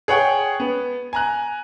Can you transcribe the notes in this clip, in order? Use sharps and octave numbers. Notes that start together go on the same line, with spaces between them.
G#4 C#5 F#5 G5
B3
G#5 A#5 F#6